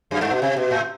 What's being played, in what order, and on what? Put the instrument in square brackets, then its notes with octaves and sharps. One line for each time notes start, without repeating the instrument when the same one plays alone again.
[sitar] F#2
G2
B2
C3
B2
A2